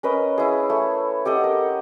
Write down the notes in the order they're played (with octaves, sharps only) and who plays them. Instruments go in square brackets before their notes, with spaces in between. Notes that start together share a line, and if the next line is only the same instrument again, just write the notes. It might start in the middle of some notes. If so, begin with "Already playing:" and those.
[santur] C#4 A#4 B4 D#5
E4 G#4
A3
G4 A4 D#5 F#5
A#4